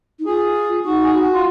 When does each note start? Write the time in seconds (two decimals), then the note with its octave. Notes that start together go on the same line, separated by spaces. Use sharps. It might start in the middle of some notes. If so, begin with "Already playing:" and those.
0.19 D#4
0.26 F4 G#4
0.85 D#4 F#4
1.03 G#4
1.15 F#4
1.34 F4